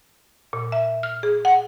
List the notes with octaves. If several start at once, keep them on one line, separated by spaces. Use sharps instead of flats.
A#2
E5
F6
G#4
F#5